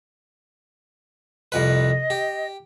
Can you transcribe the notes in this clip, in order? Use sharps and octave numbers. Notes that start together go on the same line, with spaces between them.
C2 F2 B4 D#5
G4